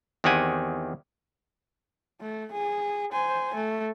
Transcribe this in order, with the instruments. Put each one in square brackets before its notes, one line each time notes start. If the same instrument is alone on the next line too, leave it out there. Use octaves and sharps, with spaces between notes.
[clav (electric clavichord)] E2 D#3 C4 G4 F#5 G#5
[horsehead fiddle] A3
G#4
C5 G#5
A3